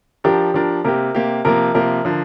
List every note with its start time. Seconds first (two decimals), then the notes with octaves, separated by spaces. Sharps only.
0.24 F3 D4 G4 A#4
0.54 F3 D4 A#4
0.84 C3 A#3 G4 A#4
1.15 C3 A#3 G4
1.45 C3 F3 A#3 A#4
1.75 C3 F3 A#3 A#4
2.05 D3 F3